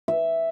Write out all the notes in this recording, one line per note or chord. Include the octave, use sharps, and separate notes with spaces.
E5